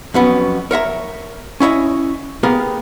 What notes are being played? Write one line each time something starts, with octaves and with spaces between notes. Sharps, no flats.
F2 F#3 B3 C#4
A#4 C#5 E5 A#5
C#4 E4 C#5 D#5
A#3 B3 G4 G#4 A#4